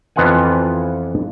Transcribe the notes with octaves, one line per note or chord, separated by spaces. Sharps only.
F2 E3 B3 F4 F#5 G#5